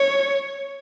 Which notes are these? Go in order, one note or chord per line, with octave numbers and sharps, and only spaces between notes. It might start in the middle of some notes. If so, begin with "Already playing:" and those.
Already playing: C#5